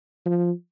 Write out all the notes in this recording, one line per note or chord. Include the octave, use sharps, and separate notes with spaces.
F3